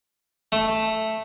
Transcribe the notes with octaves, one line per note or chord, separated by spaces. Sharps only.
A3